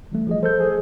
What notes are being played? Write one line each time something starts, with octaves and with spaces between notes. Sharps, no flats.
E3 G3 A3
F3 G#4 D#5
A4 C5 G6
G#4